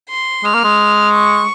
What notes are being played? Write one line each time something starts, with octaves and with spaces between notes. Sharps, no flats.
C6
G#3 F6
A#3
G#3
C#6